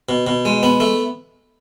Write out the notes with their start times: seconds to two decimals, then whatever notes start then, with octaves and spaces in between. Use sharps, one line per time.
0.09 B2
0.27 B2
0.45 G#3
0.63 B3
0.80 A3